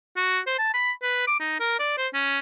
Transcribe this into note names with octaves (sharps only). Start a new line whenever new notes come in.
F#4
C5
A5
B5
B4
D6
D#4
A#4
D5
C5
C#4